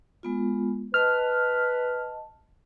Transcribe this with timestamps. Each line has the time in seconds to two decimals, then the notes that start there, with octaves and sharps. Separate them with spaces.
0.23 G#3 B3 F4
0.94 B4 D#5 A5 F6